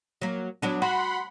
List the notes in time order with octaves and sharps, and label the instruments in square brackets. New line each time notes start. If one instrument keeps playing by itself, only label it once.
[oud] F#3 A#3
F#3 B3 D4
[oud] F#4 [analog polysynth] F#5 B5 C6